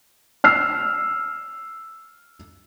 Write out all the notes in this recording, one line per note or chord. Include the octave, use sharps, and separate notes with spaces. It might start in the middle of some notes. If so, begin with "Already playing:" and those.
E6 F6 C7